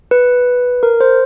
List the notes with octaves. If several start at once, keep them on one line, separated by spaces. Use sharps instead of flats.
B4
A#4
C5